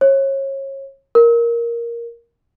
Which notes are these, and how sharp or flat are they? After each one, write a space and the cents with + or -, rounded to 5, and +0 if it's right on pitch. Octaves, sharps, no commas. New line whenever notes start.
C#5 -30
A#4 +5